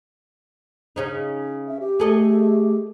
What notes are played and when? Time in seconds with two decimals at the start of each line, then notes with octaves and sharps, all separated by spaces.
0.96 C#3 C#4 D#4
1.67 E5
1.80 G4
2.00 A3 G#4 A4 D#5